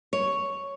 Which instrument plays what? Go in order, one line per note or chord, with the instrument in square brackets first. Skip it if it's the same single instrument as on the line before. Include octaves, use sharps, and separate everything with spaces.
[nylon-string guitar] C#5